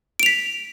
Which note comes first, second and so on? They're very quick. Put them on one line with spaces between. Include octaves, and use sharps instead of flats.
D7 F7 B6